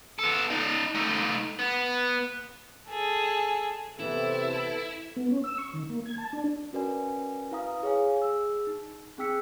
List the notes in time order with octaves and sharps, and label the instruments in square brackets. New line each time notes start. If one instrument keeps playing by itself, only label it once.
[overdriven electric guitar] B3 A4
D#4 D5
A3 D#4
B3
[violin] G#4 A4
[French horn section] C3 [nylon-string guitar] E3 B3 [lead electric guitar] E4 [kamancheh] A4
[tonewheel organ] B3
C#4
E6
C#6
D#3
A#3
G#6
A5
D4
[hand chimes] C#4 F#4 A#4 B4 D5 G#5
E4 B4 F5 A#5 D#6
G#4 C#5 F5 G#5
G#4 E6
D#4
C4 G#4 G5 E6 B6 C#7